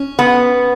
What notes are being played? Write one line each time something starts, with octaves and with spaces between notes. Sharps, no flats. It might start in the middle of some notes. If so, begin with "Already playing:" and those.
Already playing: C#4
B3